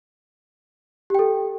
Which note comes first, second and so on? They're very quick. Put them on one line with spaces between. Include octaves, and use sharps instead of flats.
G4 G5 A4